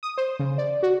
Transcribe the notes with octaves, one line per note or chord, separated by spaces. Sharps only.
D#6
C5
C#3
D5
F#4